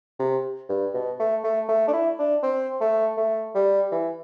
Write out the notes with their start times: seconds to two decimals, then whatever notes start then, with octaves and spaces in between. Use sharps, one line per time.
0.19 C3
0.69 G2
0.94 B2
1.19 A3
1.44 A3
1.68 A3
1.88 D4
1.93 E4
2.19 D4
2.43 C4
2.81 A3
3.17 A3
3.55 G3
3.92 E3